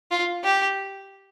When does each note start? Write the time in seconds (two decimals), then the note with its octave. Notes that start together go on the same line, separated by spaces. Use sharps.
0.11 F4
0.44 G4